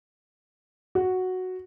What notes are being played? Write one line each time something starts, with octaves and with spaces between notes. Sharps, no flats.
F#4